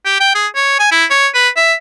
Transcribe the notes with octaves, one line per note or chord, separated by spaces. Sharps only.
G4
G5
G#4
C#5
G#5
E4
C#5
B4
E5